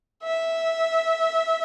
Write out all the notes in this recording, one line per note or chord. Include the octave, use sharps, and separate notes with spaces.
E5